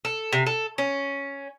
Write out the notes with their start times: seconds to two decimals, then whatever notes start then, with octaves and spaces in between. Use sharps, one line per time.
0.05 A4
0.33 C3
0.47 A4
0.78 C#4